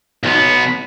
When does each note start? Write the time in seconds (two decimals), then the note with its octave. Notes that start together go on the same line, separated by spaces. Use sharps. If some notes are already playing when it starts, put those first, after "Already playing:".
0.23 B1 B3